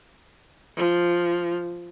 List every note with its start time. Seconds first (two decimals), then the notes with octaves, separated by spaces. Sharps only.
0.77 F3